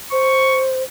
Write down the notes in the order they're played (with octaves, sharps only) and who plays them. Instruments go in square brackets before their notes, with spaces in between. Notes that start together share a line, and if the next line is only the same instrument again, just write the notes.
[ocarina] C5 [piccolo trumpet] C#6